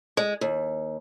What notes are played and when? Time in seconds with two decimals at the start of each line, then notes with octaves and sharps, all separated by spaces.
0.17 G#3
0.41 D#2